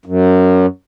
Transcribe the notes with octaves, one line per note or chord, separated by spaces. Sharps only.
F#2